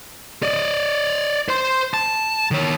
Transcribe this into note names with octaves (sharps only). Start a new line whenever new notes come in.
D5 D#5
C5 C6
A5
D#3 C#5